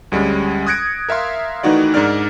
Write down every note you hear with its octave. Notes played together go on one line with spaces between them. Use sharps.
D2 G3 G#3 C#4
D#6 F#6 G#6 A#6 C#7 D7
A#4 E5 F5 C6
D#3 E3 A3 D#4 F#4 D5
G#2 D4 A#4 D5 F6